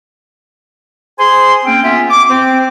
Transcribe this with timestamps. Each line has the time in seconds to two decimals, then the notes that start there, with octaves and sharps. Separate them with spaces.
1.19 G#4 C5 G#5 C6
1.65 A#3 C4 C#4 G5
1.84 B3 C#4 F4 E5
2.11 D6
2.29 C4